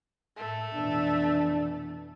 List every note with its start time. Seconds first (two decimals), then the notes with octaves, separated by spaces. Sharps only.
0.36 A2 A3
0.74 F1 B2 E3 D4